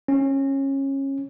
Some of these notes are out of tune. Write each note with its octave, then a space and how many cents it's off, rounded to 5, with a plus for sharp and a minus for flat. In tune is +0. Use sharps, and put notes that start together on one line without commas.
C#4 -20